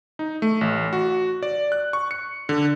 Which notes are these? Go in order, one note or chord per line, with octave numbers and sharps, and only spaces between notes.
D#4
A3
A1
F#4
D5
F#6
C#6
C#7
D3